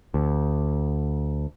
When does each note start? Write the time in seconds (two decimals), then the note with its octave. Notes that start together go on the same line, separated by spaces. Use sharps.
0.14 D2